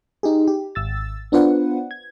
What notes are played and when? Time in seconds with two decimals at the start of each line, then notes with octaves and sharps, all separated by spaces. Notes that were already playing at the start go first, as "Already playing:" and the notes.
0.23 D#4 G4 G#4
0.48 G4
0.75 G#1 E6 A6
1.32 B3 D4 F4 B4 C5 F#5
1.91 G#6